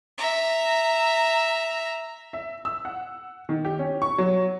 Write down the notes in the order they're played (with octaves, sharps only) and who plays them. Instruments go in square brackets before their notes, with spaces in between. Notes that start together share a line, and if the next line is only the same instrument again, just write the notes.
[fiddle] E5 A#5
[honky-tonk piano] E5
E6
F#5
D#3
G4
C#4
C#6
F#3